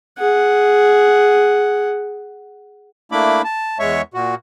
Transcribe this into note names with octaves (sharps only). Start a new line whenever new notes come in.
G#4 F#5
A3 A#3 D4 E4 B5 D6
A5
E2 G#3 C#5 E5 C#6
A#2 F#4